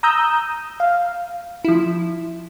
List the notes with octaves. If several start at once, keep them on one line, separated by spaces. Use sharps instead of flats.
A#5 D#6 E6 G6
F5
F3 E4